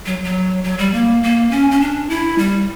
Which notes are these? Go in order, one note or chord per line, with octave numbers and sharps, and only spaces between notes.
F#3
F#3
F#3
G3
A#3
A#3
C#4
C#4
D4
E4
G3